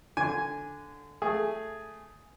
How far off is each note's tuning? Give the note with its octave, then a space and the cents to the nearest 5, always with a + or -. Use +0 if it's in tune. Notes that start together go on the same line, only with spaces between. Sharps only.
D3 +0 G#5 +0
A3 +0 G#4 +0